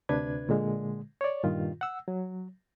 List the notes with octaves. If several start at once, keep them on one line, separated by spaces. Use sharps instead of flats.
D2 C3 D4 B4 G#6
A#2 D3 G#3
C#5 D5
G2 A#2 D#3 F4
F#5 E6
F#3